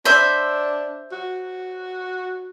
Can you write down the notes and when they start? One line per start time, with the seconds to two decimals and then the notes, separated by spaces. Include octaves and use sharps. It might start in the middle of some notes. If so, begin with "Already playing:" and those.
0.05 D4 C5 E5 B5
1.12 F#4